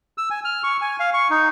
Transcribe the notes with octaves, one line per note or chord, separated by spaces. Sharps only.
E6
G#5
F6
C#6
G#5
F5
C#6
D#4